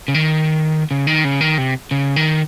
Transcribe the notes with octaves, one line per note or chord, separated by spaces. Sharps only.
C#3
D#3
C#3
D#3
C#3
D#3
C3
C#3
D#3